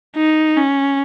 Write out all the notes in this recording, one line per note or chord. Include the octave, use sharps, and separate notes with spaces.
D#4
C#4